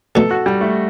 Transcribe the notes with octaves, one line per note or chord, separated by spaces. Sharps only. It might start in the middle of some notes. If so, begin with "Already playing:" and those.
B2 F#3 A3 A4
F#4
G3
A3